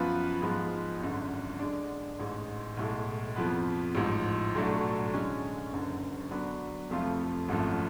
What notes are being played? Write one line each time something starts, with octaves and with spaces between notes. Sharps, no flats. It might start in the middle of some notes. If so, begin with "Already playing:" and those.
Already playing: F#2 F3 B3 F4 B4
G#2 F3 G#3 B3
G#1 F#2 D3
D3 G#3 D4
A1 G#2 G#3
B1 A2 G#3
F2 F3 B3
A1 G#2 F3
B1 A2 F#3 A3 D4
D3 G#3 C#4
F#1 F#2 D3
D3 F#3 B3 D4
F1 F2 F3 A3 F4
G#1 F#2 F3 A3